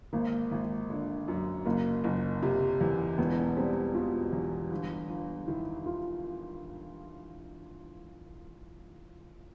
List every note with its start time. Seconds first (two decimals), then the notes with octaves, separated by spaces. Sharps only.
0.13 G#1 A#3
0.51 G#1
0.90 D3
1.28 F#2
1.65 F#1 A#3
2.04 F#1
2.43 C3
2.81 E2
3.18 E1 B3
3.57 G3 C4
3.95 B2 F4
4.32 E2
4.71 G1
5.10 G1
5.48 D#3 E4
5.86 F4